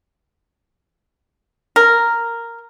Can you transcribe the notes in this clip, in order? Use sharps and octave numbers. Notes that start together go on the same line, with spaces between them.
A#4